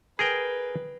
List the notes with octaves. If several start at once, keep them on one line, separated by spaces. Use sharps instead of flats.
G#4 A#4 B4 G5